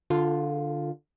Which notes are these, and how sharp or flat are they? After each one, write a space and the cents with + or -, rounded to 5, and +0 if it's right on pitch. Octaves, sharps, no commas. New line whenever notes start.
D3 +0 F4 +5